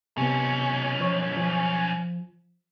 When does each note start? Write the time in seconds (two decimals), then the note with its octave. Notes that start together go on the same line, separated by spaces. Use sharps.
0.17 B1 C3 B3 C#4
1.00 F3 C#5 C#6
1.37 F3